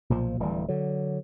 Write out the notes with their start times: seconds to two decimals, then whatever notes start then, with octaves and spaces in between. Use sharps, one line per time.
0.10 B1 A#2 F3
0.40 D1 E3 G3
0.68 D3 F#3